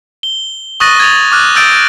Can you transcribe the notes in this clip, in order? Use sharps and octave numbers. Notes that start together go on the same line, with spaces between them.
G7
C#6 D#6 F#6 A6 A#6 D#7
G#6 A6 F7
D6 F6 F#6
D#6 E6 G6 A6 D7